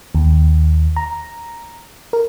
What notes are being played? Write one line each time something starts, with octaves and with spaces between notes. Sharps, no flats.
D#2
A#5
A#4